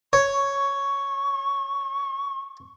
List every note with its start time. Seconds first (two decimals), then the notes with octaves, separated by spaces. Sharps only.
0.13 C#5 C#6